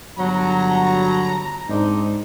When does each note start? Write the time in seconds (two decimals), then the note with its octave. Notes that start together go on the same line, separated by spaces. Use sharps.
0.18 G1 F#3 A#5
1.69 G#2 C4 D4 D#4